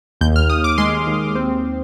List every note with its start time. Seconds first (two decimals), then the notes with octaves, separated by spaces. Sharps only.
0.21 D#2 G6
0.36 F6
0.50 D#2 D#6
0.64 D6
0.78 G#3 C6
1.07 D#2
1.35 C4